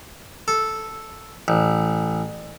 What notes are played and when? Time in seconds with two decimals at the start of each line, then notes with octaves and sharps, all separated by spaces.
0.48 A4
1.48 A1